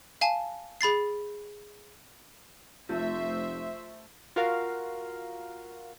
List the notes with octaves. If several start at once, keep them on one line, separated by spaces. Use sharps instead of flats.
F5 G#5 A5
G#4 B5 A6 C7
F1 F3 A3 C5 E5
F4 F#4 A#4 F5